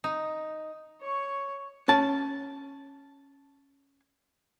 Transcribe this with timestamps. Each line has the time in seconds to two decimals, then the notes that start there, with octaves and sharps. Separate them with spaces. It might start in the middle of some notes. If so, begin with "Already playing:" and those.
0.04 D#4
1.01 C#5 C#6
1.88 C#4 A5